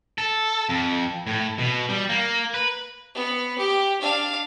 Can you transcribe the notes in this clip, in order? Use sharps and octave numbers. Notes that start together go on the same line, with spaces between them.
A4
F2
A2
B2
G3
A#3
B4
B3
G4
D4 F5